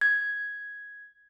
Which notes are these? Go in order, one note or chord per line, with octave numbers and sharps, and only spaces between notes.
G#6